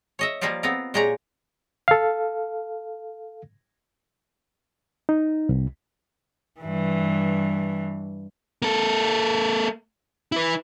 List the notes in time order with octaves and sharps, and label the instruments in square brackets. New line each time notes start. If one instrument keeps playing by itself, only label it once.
[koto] C#5 D#5 E5
F3 G3 A#3 D#4 F4 G4
B3 C4 F4 A#4
A#2 G#3 G4 G#4 C#5 A#5
[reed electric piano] A4 F5
D#4
C2
[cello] G2 E3
[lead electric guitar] A#3 A4
E4 B4